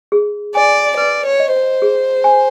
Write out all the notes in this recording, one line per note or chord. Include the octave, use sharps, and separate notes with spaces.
G#4
D5 G#5
B4 D5
C#5
D#5
C5
G#4
G#5